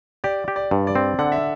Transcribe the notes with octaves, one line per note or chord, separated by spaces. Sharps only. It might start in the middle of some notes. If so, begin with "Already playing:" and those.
G4 D5
G4
D5
G2
D5
C4
D3 F#5
E5